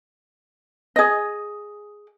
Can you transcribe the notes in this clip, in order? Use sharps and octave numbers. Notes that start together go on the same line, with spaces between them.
G#4 D#5